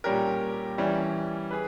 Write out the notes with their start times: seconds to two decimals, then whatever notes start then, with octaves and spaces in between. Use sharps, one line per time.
0.04 A#2 G3 C#4 G4 A#4
0.78 E3 G3 C#4
1.51 G#4 B4